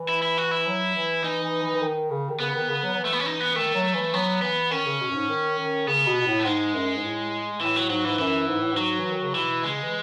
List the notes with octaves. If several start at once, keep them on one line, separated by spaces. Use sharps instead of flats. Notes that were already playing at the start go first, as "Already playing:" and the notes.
Already playing: E3
E4
E4
F#4
E4
F#3
E3
E3 D#4
E3
E3
E3
D#3
C#3
D#3
C#3 B3
D#3
C#3
F#3
F#3
E3
A3
B3
C#4
D#4
B3
D#3 A3
F#3
E3
F#3 B3
E3 B3
D#3 C#4
C#3
B2
F#2
G#2
D#3
D#3
C#3 B3
B2
B2
A2
A3
G#2 G#3
F#2
G#2
A2
A2 E3
F#3
G#2 F#3
G#2 E3
F#2 E3
G#2
A2
G#2 F#3
E3
D#3
C#3
B2 E3
C#3 G#3
E3